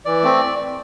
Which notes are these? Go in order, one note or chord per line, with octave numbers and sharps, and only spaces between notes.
E3 D5
A3 C4